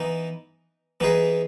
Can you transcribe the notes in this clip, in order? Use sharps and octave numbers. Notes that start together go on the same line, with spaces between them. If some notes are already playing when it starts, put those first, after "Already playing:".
Already playing: E3 B3 D#4
E3 B3 D#4 G#4 B4